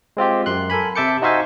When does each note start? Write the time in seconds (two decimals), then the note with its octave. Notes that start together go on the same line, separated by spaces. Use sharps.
0.17 G#3 C4 F4 G4
0.46 F#2 C6 F#6
0.70 A4 A#4 G#5 B5
0.95 C3 E5 A5 D6 G6 C#7
1.22 D#4 F#4 C5 E5 F5 G#5